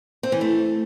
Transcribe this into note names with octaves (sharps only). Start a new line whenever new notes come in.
C4
E3
A3